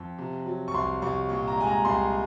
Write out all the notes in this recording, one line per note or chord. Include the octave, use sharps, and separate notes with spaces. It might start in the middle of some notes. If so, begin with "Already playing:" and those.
Already playing: F2
C3
F#3
C#6
C2 C6
C2 C#6
A#2 C#6
A#5
G#3 G#5
A#5
C2 C6